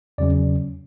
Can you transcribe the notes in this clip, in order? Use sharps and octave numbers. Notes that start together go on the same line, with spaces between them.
E2 C#3 F#3 C#4 D5